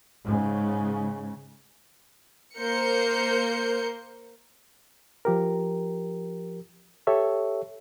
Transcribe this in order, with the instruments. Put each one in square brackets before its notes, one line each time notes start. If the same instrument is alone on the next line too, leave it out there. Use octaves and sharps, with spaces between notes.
[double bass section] G#2 C#3
[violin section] A#3 A#4 C5 G6 C#7
[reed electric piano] F3 G4 A#4
G4 A4 C#5 E5